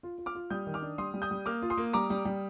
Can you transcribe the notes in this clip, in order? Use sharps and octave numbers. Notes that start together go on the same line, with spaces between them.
F4
F4
D6 F6
F4
G3 D#6 G6
D#3
D6 F6
D4
G3 C6 D#6
G3
D#6 G6
G3
A#3 D6 F6
F4
C6 D#6
A#3
G3 A#5 D6
G3
G3